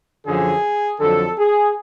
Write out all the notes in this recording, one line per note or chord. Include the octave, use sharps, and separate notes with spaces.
F#2 D3 F3 G#4
F2 D3 F#3 A4
G#4